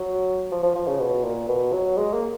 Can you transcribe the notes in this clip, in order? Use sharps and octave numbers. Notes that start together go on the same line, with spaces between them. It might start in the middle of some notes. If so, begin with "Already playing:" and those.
Already playing: F#3
F3
F3
F3
C#3
B2
A#2
B2
F#3
G#3
A#3